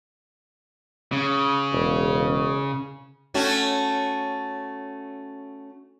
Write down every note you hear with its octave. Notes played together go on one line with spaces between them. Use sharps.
C#3
E1
A3 C#4 F#4